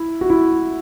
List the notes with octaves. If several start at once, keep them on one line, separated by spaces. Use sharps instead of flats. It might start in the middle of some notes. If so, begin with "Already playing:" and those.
Already playing: E4
F#4
E4